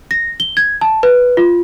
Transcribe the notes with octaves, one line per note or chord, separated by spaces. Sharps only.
A#6
G7
G#6
A5
B4
F4